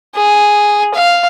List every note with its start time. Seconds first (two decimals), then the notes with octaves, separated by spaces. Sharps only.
0.15 G#4
0.94 F5